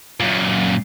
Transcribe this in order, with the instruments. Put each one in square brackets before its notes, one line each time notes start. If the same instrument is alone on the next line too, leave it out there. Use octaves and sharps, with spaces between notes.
[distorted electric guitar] F#2 A#2